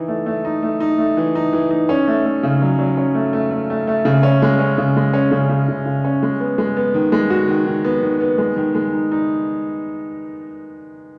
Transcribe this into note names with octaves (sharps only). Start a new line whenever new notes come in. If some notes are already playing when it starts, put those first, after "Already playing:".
Already playing: E3 D#4
A3
A3
D#4
A3
D#4
A3
E3
D#4
E3
D#4
C#4
A3
A3
C#3
F#3
F#3
C#4
A3
A3
A3
A3
A3
C#3
C#4
G#3
C#4
C#3
G#3
C#4
C#3
C#3
C#3
C#3
C#4
G#3
B3
G#3
B3
D#3
G#3
F#4
D#3
D#3
B3
D#3
B3
G#3
D#3
G#3
D#4
D#4